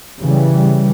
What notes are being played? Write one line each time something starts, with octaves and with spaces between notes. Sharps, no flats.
C#3 E3 G3